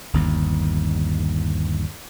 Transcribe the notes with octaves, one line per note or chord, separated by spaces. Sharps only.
G1 D#2